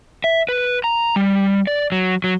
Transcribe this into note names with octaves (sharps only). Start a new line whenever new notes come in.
E5
B4
A#5
G3
D5
F#3
F#3